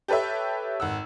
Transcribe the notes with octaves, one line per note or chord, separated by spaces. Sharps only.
G4 A4 B4 C#5 E5
G#1 F#5 E6